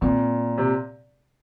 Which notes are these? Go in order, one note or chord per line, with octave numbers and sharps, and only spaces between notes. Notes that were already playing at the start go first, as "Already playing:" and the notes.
A#2 C4
C3